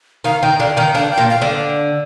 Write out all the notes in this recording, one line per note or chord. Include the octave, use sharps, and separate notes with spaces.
D#3 D#4 F5
D#3 D#4 G5
D3 D4 F5
D#3 D#4 G5
D3 D4 F5
G5
A#2 A#3
F5
D3 D4